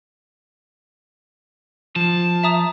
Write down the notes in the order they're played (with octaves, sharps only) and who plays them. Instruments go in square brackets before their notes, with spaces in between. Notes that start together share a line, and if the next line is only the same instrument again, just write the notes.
[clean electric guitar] F3 [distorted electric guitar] A5
[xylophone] E5 A#5 D#6